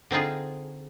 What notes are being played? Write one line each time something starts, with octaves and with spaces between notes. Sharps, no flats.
D3 C4 D#4 F4 G#4